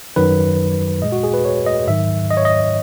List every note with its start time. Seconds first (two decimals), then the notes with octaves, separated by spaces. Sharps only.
0.16 F#2 D#3 F#3 B4
1.02 A#2 G#3 D#5
1.12 F#4
1.24 G#4
1.34 B4
1.45 C#5
1.66 D#5
1.87 G#2 D#3 F#3 E5
2.31 D#5
2.37 C#5
2.45 D#5